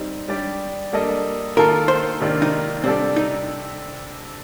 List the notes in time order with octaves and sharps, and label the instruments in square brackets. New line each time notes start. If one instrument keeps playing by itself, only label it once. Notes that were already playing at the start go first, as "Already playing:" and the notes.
Already playing: [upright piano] G3 C4 D#4
G3 D4 G4 D5
G3 A#3 D4 A4 D#5
[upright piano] D#3 A#3 F4 A4 [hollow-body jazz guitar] A#4
[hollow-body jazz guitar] C5
[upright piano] C3 D#3 A#3 D4 F4
[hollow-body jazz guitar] D#4
[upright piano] C3 G3 D4 A4 D5 [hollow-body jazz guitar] C4
[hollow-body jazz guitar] D#4